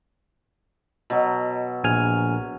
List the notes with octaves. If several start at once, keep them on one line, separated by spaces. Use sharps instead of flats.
B2 F#3
A#1 G#5 F6